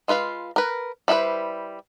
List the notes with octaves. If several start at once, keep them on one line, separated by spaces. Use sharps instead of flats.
G#3 F4 B4 F5
A#4 B4
G3 E4 G#4 B4 C5